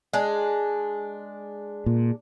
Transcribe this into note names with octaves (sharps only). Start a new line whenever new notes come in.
G#3 D4
A#2